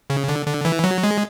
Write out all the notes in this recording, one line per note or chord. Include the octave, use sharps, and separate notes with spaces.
C#3
D3
D3
E3
F#3
G#3